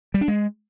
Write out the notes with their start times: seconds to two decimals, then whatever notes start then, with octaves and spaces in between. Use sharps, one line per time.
0.14 G3
0.21 D4
0.28 G#3